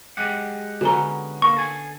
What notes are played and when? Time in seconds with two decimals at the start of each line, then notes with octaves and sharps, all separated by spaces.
0.17 G#3 G4 F#5
0.81 D3 B3 C#4 F#4 A#5
1.42 A#3 C#6
1.56 A4 G#5